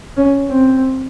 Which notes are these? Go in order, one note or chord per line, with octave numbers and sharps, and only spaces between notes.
C#4
C4